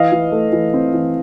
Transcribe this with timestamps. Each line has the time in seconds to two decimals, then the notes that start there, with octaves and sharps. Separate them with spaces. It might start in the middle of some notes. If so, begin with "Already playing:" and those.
Already playing: E3 D#5 F5
0.12 E3
0.32 A3
0.52 E3
0.74 C4
0.94 E3